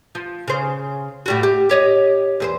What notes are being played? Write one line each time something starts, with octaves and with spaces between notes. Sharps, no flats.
F3
C#3 C5
A2 G3 F#4
G4
G4 C#5 D#5
E2 G#4 C5